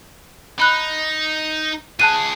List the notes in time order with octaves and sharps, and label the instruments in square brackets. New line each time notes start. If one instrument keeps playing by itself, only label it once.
[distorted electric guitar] D#4 [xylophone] B5 F#6
[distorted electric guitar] C#2 G#4 [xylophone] A5 F#6 D#7